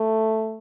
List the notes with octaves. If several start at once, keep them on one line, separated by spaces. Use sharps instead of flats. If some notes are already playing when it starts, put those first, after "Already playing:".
Already playing: A3